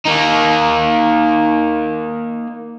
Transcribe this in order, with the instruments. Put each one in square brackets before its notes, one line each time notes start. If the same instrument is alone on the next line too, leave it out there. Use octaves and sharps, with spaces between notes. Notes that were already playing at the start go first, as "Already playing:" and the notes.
[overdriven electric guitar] A#3 D#4